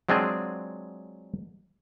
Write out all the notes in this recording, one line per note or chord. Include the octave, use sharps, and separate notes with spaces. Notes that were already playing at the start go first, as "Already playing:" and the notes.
F#3 G#3 C4 D4 F4 G#4